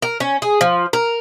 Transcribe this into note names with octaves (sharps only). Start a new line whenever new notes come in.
A#4
C#4
G#4
F3
A#4